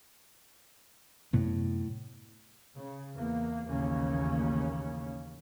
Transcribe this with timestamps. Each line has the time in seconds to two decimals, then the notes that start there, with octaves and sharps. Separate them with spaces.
1.33 F#2 A2 C3 B3
2.76 C#3
3.16 E2 A#3
3.66 A1 D#2 C#3 A#3 C#4